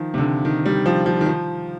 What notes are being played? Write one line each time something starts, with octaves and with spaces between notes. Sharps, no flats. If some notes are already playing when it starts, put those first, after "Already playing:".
Already playing: D#3 F3
C3
D3
D#3
G3
F3
F3
D#3
F3